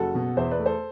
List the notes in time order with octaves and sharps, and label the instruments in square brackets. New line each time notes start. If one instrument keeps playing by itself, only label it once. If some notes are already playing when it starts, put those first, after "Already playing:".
Already playing: [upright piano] F#1 F#4 A4
B2
E2 C5 E5
B4 D5
A3
A4 C5